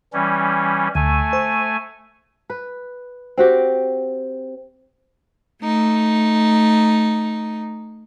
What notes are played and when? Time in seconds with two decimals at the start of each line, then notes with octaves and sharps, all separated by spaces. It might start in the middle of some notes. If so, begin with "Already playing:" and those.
0.13 E3 G3 C#4
0.95 D2 A3 G#5
1.33 C5
2.50 B4
3.38 C4 F#4 G4
5.63 A3 D#4